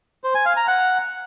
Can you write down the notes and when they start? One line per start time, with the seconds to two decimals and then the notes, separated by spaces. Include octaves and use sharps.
0.24 C5
0.35 G#5
0.46 F5
0.57 A#5
0.67 F#5